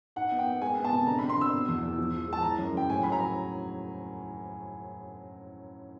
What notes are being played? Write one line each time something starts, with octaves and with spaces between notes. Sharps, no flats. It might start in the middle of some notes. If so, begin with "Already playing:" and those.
D#4 F#5
B3
G5
B3
G#3 G#5
B3
A5
C3
D3 A#5
B5
C4
C6
D3 E6
B2
E2
E2
F3
F3
G#3 A5
E3 A#5
F#2
C#3 G5
A2 G#5
F#3 B5
A#5
A2